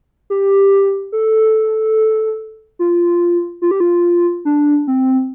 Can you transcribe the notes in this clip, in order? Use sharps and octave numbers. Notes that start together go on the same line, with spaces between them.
G4
A4
F4
F4
G4
F4
D4
C4